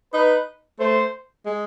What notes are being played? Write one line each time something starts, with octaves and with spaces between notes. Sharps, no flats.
D#4 B4
A3 C5
G#3